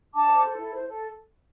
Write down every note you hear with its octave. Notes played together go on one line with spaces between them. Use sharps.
D4 A5 D6
C5
A4
E4
C5
A4